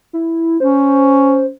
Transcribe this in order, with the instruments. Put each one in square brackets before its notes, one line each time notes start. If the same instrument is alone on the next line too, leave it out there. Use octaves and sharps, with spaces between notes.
[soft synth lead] E4
[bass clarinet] C#4 [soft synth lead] C5